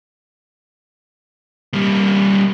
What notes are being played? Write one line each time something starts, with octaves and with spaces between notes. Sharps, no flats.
G3 A#3